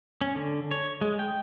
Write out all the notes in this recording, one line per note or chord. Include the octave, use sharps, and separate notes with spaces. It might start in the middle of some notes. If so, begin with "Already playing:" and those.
C#4
D3
C#5
G#3
G5